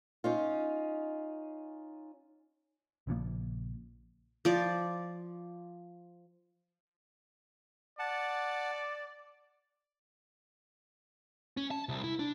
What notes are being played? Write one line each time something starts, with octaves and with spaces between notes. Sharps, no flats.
C#4 D#4 F4
A#1 C#3 F3 A#3
F3 D5
D5 F#5 A5
C#4
A5
C2
E4
D4